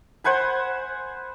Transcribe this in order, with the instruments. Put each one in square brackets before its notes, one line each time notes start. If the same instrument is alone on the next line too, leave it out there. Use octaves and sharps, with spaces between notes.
[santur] C5 F#5 G#5 B5